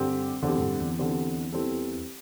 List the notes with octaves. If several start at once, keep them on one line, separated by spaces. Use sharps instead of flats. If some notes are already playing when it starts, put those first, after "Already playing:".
Already playing: G2 D3 C4 G4
E2 D3 C4 G4
A2
G2
E2
D3 C4 G4
E3 G3 C4 A4